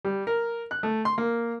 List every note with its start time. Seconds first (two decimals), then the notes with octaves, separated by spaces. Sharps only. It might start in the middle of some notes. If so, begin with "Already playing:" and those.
0.05 G3
0.27 A#4
0.71 F#6
0.83 A3
1.05 C6
1.18 A#3